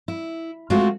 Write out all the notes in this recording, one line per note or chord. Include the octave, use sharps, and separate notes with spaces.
E4
G#3 A3 C4 F4 F#4